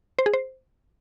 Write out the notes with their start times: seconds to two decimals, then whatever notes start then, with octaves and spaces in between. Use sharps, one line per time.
0.19 C5
0.26 G#4
0.34 C5